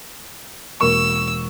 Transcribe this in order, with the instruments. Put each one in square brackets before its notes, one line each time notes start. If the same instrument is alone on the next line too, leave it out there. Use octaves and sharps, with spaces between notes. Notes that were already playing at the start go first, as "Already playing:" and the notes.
[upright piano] E1 A#3 C#6 [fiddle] E6